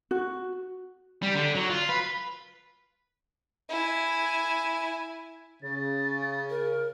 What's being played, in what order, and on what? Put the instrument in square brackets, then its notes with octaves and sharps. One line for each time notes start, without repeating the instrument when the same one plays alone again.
[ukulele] F#4
[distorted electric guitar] G3
D3
F#3
F4
B4
[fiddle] E4 G#5
[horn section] C#3 [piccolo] A6
[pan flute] A#4